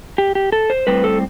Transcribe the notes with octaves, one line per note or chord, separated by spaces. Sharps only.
G4
G4
A4
C5
A2 G3 C4 B4
A4